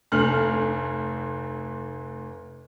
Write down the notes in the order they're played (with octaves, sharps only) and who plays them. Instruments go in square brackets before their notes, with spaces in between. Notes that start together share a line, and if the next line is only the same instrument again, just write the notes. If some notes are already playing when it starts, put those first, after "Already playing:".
[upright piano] F1 D2 A3 F6 F#7